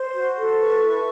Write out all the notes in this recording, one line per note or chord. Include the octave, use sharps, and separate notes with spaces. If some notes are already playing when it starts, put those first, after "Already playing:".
Already playing: C5 C6
F#4
A4
B4 C#6
E4